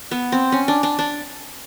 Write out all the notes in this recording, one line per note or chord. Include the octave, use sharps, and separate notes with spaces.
B3
C4
C#4
D4
D4
D4